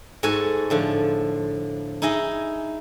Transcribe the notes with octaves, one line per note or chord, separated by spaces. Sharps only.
G#2 F#4 A4 G#5 A5
A2 D3 F3
D#4 E4 G#4 D#5